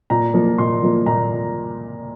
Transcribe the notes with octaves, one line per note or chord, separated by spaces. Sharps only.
A#2 A#5
F3 A#3
A#2 C6
F3 A#3
A#2 A#5